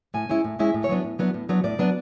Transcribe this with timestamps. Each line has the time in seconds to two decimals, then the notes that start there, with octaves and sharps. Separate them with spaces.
0.14 A2 G#5
0.29 G#3 C#4 E4
0.44 A2
0.59 G#3 C#4 E4 E5
0.74 A2
0.84 C#5
0.89 F#3 B3 D4
1.04 A2
1.19 F#3 B3 D4
1.34 A2
1.49 F#3 B3 D4
1.64 A2 D5
1.79 F#3 B3 D4